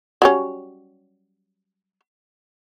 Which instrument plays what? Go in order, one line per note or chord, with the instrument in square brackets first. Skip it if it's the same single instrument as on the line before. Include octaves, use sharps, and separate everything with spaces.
[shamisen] F#3 G3 C#4